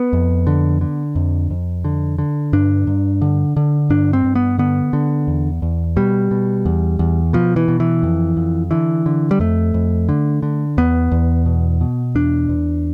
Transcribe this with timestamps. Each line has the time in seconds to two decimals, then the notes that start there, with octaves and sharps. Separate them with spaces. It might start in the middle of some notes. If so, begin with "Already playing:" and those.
Already playing: B3
0.13 F2
0.47 D3
0.81 D3
1.16 F2
1.50 F2
1.85 D3
2.18 D3
2.53 G2 D4
2.87 G2
3.22 D3
3.57 D3
3.90 G2 D4
4.13 C4
4.24 G2
4.35 B3
4.58 D3 B3
4.93 D3
5.28 E2
5.62 E2
5.96 B2 G3
6.31 B2
6.66 E2
6.99 E2
7.33 B2 F3
7.56 E3
7.68 B2
7.80 E3
8.03 F2
8.37 F2
8.71 D3 E3
9.06 D3
9.31 G3
9.40 F2 A3
9.74 F2
10.09 D3
10.43 D3
10.78 E2 B3
11.12 E2
11.46 B2
11.81 B2
12.15 E2 D4
12.49 E2